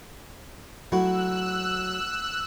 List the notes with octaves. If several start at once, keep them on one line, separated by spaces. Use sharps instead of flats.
F#3 A3 E4 F#4 E6 F#6